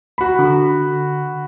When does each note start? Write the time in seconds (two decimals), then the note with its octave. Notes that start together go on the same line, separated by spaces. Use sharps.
0.18 F#4 B5
0.39 D3